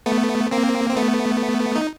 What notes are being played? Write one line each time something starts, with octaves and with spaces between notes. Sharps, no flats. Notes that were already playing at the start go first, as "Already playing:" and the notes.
A3 B3
A#3 C4
C4
A3 B3
D#4